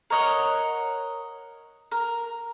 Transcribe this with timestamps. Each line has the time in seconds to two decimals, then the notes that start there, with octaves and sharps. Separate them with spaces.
0.10 A#4 C#5 D#5 F#5
1.92 A#4